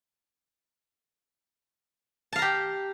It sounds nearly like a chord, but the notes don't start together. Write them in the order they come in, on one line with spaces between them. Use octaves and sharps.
A5 F5 A#5 G4